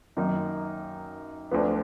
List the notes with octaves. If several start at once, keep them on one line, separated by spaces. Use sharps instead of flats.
F#2 D#3 A#3 D#4
D2 D3 F3 B3